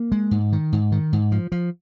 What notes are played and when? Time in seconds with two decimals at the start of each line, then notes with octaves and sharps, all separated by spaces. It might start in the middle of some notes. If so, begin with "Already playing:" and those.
Already playing: A#3
0.12 G#3
0.31 G#2
0.53 D#3
0.73 G#2
0.92 D#3
1.13 G#2
1.32 F3
1.52 F3